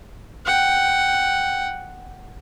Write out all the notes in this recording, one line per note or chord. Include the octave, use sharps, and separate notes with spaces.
F#5 G5